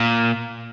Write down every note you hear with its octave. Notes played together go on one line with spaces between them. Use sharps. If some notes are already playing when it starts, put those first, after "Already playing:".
Already playing: A#2